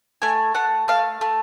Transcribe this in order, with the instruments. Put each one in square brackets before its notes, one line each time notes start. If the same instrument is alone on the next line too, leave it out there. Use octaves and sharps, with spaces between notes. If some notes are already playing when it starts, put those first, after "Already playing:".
[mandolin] A3 G#5
A3 F#5
A3 F5
A3